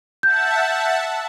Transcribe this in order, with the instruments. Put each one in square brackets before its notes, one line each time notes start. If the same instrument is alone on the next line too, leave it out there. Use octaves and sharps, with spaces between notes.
[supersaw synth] E5 F#5 A5 [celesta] G6